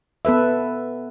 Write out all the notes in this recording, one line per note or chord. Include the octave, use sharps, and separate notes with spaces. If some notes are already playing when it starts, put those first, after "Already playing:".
B3 A4 B4 E5